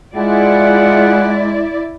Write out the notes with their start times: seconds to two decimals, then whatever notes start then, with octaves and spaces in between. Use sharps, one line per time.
0.15 G#3 E4 F4 G#4 D5 F#5